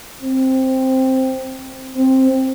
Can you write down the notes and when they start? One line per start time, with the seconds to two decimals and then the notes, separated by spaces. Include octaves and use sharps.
0.22 C4
1.96 C4